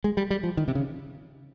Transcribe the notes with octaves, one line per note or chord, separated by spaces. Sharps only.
G#3
G3
G3
F3
D#3
C3
C#3